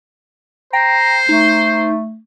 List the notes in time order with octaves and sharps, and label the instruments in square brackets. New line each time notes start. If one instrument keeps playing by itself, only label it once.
[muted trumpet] C5 [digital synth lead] G5 [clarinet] A#5
[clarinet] A3 [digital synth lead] D#4